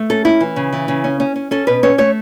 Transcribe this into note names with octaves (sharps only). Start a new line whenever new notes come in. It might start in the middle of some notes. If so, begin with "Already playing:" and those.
Already playing: A3
C#4 A4
C#4 E4
E3
C#3
E3
C#3
C#4
C#4
C#4
C#4 A4
B2 B4
C#4 C#5
A3 C#5